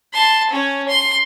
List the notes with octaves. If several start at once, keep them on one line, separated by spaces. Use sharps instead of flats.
A5 C6
C#4 C#5
C6